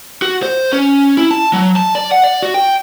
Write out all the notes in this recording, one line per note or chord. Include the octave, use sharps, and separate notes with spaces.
F#4
C5
C#4
E4
A5
F#3
A5
D5
F#5
D5
F#4
G5